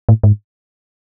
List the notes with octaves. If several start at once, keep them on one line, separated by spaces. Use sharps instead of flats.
A2
G#2